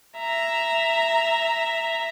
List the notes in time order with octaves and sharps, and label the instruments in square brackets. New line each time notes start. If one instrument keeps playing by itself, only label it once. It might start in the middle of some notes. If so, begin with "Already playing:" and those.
[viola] E5 A#5